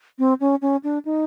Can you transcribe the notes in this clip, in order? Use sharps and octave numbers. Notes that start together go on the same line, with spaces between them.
C4
C#4
C#4
D4
D#4